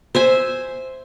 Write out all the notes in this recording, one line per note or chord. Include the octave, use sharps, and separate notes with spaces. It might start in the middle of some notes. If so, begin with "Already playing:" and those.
C5 E5 G#5